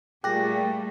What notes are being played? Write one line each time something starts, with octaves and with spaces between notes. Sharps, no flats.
A#2 G3 A3 G4 G#4 F#6 A#6